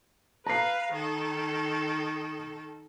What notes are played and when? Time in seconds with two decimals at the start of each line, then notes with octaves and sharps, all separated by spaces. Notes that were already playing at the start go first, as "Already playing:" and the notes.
0.47 B4 F5 A#5 C7
0.93 D#3 A4